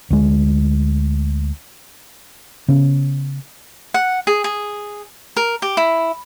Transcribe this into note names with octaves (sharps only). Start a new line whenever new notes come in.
D2 G#3
C#3 B3 C#4
F#5
G#4
G#4
A#4
G4
E4